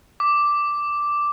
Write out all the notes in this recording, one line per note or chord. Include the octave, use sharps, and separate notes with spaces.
D6